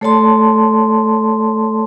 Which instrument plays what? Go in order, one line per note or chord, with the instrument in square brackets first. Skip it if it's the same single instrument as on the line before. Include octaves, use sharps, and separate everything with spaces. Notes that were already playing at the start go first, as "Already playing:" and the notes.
[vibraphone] A3 A4 C#5 D5 A5 C6